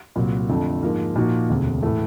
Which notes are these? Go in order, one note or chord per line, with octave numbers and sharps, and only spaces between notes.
C2 A#2 F#3
F2 D3 F3 A3
G#2 F3 A#3
A#2 F3 A#3 D#4 F#4
E1 D2 C3
A2 E3 A3